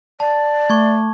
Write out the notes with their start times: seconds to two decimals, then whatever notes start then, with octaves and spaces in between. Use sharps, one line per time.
0.20 D5 A5
0.70 A3 C#6 G#6